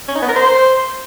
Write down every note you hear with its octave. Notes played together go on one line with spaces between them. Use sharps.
C#4
D#4
B3
A#4
C5